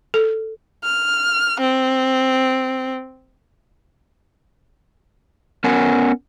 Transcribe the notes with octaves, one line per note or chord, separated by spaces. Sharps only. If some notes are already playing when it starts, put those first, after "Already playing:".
A4
F6
C4
B3 C#4 A#4 F#5 G#5